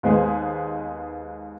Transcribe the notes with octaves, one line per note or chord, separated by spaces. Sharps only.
D#2 G#3 B3 G#4 C5